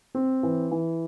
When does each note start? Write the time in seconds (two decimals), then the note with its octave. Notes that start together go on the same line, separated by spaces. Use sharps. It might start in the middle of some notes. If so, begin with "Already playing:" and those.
0.15 C4
0.43 E3
0.71 E3